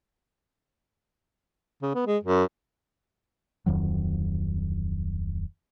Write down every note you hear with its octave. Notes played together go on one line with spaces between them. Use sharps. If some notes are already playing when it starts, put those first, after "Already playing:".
C#3
B3
G#3
F#2
D1 F2 D#3 F#3